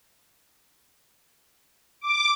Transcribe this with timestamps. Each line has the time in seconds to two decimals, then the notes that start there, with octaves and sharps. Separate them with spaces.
2.01 D6